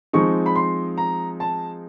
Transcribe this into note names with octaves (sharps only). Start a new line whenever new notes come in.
F3 G#3 C4 D#4 C#6
B5
C6
A#5
A5